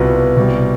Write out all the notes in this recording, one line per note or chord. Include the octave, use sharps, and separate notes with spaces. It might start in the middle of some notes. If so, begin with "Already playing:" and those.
Already playing: C2 B2 B3 F4
C2 B2 G3